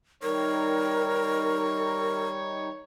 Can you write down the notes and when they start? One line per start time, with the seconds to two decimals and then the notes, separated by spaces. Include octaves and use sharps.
0.23 D#3 G3 D#4 A#4 C#5